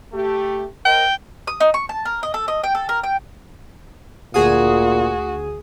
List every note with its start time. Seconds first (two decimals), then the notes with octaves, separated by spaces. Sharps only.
0.13 A3 G4
0.86 A#4 C5 D#5 G5
1.47 D#6
1.60 D#4
1.74 C#6
1.89 A5
2.05 A#4
2.23 D#5
2.34 A4
2.48 D#5
2.63 G5
2.75 A4
2.89 A#4
3.03 G5
4.34 D2 A#2 F#4 G#4 D#6